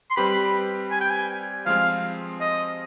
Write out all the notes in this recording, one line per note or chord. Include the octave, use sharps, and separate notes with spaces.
C6
G3 C4 G4 B4 B5
G#5
G5
G#5
F3 G#3 C4 F5
D#5